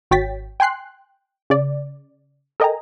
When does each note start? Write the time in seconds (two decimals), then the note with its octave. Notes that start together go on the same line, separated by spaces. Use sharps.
0.11 G#1 F#4 C#5 G5 A6 B6
0.60 G5 G#5 C6 F#6 C7
1.50 C#3 D5
2.60 A4 A#4 D#5 G5 G#5 A#5